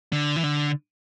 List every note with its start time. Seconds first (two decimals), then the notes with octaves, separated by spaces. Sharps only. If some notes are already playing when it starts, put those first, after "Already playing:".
0.12 D3
0.36 E3
0.43 D3